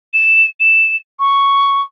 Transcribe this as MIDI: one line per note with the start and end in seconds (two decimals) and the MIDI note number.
0.14 0.47 100
0.60 0.96 100
1.19 1.82 85